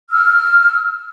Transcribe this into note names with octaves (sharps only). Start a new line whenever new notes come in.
E6 F6